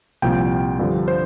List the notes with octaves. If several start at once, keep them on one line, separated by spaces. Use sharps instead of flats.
C2 A#2 F3 G5
G2 D3 F3
C5